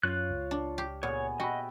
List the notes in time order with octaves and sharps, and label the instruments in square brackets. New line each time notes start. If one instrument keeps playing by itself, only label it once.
[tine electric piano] F#2 [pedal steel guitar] F4 F#6 [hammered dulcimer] C#5 F5
[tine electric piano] C#2
[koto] D4
G4
[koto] A#2 [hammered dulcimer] B3 G#4 [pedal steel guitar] C#5
[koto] F#4 [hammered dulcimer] G4 E5 [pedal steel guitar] D#5 [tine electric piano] G5 B5